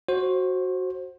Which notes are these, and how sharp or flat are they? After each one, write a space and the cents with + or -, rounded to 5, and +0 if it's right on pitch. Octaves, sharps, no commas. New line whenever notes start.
F#4 +0 C5 +20